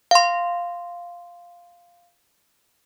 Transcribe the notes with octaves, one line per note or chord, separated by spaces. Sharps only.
F5 C6